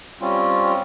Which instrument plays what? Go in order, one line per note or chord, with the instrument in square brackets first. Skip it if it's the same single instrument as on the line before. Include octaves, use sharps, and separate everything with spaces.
[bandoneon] G3 C4 C#4 F4